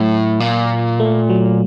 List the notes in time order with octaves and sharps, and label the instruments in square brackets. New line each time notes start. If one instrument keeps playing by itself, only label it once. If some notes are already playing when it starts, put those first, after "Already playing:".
Already playing: [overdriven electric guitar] A2 [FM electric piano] F#3
[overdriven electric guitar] A#2
[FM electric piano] A3
F#3